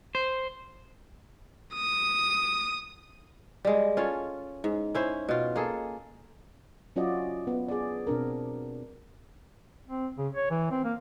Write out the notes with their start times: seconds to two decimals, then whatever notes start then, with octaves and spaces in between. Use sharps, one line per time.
0.15 C5
1.74 D#6
3.65 G3 G#3
3.97 C#4 F4 A4 C#5
4.64 G#2
4.95 C#4 E4 C5
5.29 B2 F4
5.56 A#3 G#4 A4
6.96 F#3 C#4 F4 F#4 D5 D#5
7.47 B3
7.68 G#4 D5
8.07 B2 C4 D4 A#4
9.88 C4
10.18 C#3
10.35 C#5
10.50 E3
10.71 C4
10.84 A#3